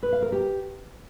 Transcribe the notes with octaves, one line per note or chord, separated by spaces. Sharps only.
B4
F5
A#4
G4